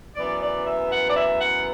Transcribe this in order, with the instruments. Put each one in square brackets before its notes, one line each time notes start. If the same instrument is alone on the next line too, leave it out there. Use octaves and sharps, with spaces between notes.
[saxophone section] F#2 E3 B3 D5
D5
E5
F#5
D5
E5
F#5